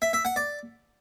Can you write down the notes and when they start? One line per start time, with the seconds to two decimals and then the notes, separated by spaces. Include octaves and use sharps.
0.02 E5
0.13 E5
0.25 F#5
0.36 D5